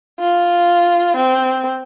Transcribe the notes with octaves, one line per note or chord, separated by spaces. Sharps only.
F4
C4